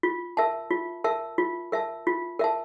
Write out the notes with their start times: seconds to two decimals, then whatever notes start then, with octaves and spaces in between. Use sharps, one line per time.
0.03 F4
0.37 A#4 E5 A5
0.70 F4
1.04 A#4 E5 A5
1.38 F4
1.72 A#4 E5 A5
2.07 F4
2.39 A#4 E5 A5